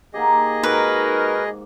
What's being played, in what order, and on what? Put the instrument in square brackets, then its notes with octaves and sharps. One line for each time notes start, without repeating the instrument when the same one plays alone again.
[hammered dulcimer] A#3 D#4 G4 [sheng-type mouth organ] G#4 D#5
[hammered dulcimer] G#2 [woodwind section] D#4 F#4 A#4 [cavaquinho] B4